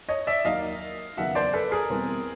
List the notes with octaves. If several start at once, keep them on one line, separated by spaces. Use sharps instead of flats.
C#5 D#5
D5 E5
D#2 D#3 F#3 A#3 D#5 F5
D#2 C#3 F#3 B3 E5 F#5
C5 D5
A4 B4
G#4 A#4
E2 B2 G3 C4